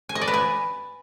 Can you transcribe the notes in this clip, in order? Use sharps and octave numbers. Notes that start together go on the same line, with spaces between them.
G#5
D#5
D5
B4
G#5